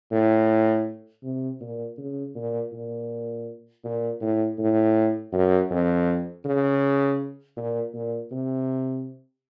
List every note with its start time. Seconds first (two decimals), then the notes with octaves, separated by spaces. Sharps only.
0.11 A2
1.23 C3
1.60 A#2
1.98 C#3
2.35 A#2
2.72 A#2
3.84 A#2
4.21 A2
4.59 A2
5.33 F#2
5.71 F2
6.45 C#3
7.57 A#2
7.94 A#2
8.31 C3